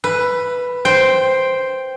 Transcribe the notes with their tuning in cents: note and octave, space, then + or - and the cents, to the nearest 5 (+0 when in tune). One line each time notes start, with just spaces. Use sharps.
B4 +0 E5 +30
C5 +0 G5 +0